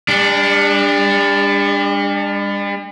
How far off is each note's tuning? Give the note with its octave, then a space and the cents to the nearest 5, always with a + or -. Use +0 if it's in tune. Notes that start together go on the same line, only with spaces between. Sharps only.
G3 +45 D4 +0